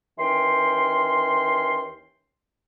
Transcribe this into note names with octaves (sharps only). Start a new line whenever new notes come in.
D#2 E3 C#4 G5 C6